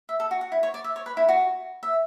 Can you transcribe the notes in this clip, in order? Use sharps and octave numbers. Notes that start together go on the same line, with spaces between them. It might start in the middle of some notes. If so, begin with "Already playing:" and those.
E5
A4
F#4
F#4
E4
C#5
D5
E5
C#5
B4
E4
F#4
E5